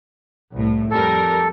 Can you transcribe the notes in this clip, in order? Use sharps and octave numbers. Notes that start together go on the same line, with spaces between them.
C2 A2
F2 G3 A4 A#4